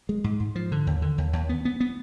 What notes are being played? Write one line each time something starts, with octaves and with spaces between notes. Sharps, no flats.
G#3
G#2
G#2
F3
D3
D#2
D3
D#2
D#2
B3
B3
B3